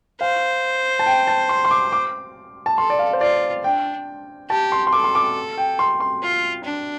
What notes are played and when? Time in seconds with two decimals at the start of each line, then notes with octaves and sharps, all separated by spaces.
0.20 C5 F5
0.99 A5
1.06 G5
1.27 A5
1.49 C6
1.65 C6
1.71 D6
1.92 D6
2.66 A5
2.78 A4 C6
2.90 D5
2.99 F5
3.13 C5
3.21 F4 D5
3.64 D4 G5
4.50 G4 A5
4.72 C6
4.87 C6
4.93 A4 D6
5.04 C6
5.15 D6
5.58 G5
5.79 C6
6.00 C6
6.22 F4
6.65 D4